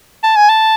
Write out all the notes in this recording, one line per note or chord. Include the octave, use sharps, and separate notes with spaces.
A5
G#5
A5